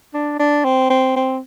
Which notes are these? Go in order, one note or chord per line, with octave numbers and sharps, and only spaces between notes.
D4
D4
C4
C4
C4